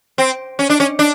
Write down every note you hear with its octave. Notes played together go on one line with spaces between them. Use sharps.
C4
C#4
D4
C#4
D4